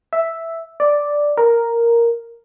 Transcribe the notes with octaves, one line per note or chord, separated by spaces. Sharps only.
E5
D5
A#4